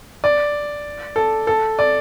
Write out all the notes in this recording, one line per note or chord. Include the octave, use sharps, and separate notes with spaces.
D5
A4
A4
D5